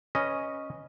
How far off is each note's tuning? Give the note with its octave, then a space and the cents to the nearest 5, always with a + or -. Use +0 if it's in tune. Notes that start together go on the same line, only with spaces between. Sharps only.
C#4 +0 B4 -10 D#5 +0